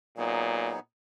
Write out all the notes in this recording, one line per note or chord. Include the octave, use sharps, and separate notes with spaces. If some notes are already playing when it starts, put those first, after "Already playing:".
A#2 F#3 B3 D#4 G#4